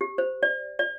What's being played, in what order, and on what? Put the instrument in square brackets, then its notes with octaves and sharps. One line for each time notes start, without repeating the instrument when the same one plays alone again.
[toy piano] G4
C5
D5
D5